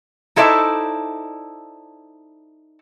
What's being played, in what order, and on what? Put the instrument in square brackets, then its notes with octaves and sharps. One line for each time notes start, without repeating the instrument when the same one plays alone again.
[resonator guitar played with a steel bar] D#4 E4 A4 C5 D5 E5